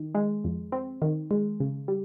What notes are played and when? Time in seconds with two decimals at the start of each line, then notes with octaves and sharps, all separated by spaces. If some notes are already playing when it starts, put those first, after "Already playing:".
Already playing: D#3
0.15 G#3
0.44 F2
0.72 C4
1.02 D#3
1.31 G#3
1.60 C#3
1.88 G3